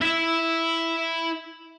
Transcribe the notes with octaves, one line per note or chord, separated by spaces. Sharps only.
E4 E5